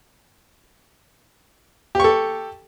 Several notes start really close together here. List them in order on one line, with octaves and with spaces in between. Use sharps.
G4 C#6 A4